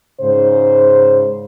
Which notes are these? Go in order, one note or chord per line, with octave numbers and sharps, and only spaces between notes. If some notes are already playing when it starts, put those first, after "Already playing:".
G#2 C#3 C5